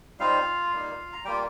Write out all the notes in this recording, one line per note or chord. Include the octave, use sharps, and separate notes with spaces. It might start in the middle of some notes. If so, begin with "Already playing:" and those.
G3 C4 D#4 F4 F5
G3 A#3 D#4
A#5
G3 A#3 F4 G4 G5